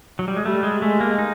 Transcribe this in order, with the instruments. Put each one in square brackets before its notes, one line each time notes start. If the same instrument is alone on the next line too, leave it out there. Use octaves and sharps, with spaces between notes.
[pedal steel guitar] F#3
G3
G#3
[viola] G3 [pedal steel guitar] A3
[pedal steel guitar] G#3
[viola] G#3 [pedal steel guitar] A3
[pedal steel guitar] A#3
D#4